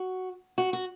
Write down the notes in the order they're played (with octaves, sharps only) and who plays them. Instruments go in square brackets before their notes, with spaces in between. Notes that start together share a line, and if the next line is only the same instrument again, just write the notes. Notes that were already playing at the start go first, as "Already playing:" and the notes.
Already playing: [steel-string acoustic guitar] F#4
F#4
F#4